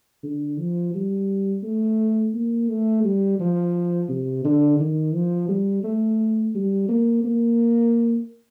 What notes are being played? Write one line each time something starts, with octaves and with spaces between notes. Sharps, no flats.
D3
F3
G3
A3
A#3
A3
G3
F3
C3
D3
D#3
F3
G3
A3
G3
A#3
A#3